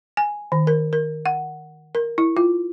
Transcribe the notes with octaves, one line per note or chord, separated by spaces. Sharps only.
G#5
D#3
A#4
A#4
F#5
A#4
E4
F4